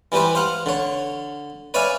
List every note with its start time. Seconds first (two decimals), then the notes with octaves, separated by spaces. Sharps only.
0.12 E3 G3 G4 B4 C5
0.35 C5 F5 F#5
0.66 D3 C#5
1.74 B4 C#5 D5 E5 F5 G#5